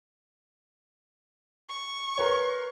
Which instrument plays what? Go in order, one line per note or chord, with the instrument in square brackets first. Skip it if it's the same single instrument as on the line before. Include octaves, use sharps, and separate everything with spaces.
[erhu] C#6
[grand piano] A#4 B4 C#5